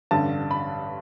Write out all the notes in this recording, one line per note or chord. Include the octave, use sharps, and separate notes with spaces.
A1 G2 D3 A5
B5